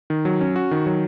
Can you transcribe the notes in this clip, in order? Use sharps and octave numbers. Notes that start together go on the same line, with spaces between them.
D#3
F#3
C#4
F#4
D#3
F#3